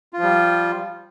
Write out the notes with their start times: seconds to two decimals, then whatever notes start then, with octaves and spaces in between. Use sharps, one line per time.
0.13 F4
0.18 F3
0.23 G3